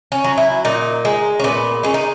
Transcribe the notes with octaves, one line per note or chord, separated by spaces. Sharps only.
C#4
F#3
E4
A#2 D#4
G#3
C#4
A#2 B3
G#3 C#4
D#4